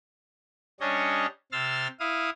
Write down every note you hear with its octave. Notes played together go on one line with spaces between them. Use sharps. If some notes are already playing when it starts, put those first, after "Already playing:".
G3 C#4 D4 C#5 D#5
C3 C6 E6 F6 A6
E4 F5 D#6